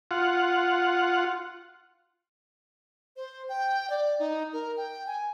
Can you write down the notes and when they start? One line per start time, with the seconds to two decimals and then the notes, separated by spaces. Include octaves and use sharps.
0.11 F4 F#5
3.16 C5
3.49 G5
3.90 D5
4.19 D#4
4.53 A#4
4.77 G5
5.07 G#5